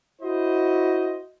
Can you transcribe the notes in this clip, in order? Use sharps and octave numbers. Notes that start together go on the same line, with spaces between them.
E4 F#4 C5 D#5